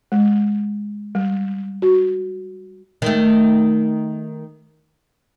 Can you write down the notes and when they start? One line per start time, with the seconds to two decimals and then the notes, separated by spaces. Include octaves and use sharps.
0.12 G#3
1.15 G3
1.82 F#4
3.02 D#3 A3